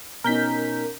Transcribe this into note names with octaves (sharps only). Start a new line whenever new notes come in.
B2 C#4 D#4 A#4 G6 B6